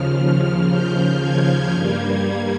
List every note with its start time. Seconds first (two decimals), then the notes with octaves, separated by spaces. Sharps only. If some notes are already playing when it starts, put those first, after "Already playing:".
Already playing: D#2 C#3 F3 F6
0.70 G6
1.21 G#6
1.73 G2 G3 A#3 G#6
2.24 G#6